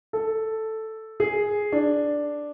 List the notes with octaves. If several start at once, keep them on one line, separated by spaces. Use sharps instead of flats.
A4
G#4
D4